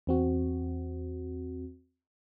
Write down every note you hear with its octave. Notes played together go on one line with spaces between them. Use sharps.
E2 C4 F#4